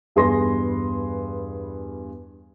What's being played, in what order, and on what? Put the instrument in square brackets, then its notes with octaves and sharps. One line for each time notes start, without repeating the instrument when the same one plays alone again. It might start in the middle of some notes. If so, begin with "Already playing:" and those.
[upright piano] E2 G2 G#4 B4 C6 A#6